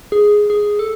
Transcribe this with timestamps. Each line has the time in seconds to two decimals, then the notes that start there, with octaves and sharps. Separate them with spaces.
0.12 G#4
0.50 G#4
0.79 A4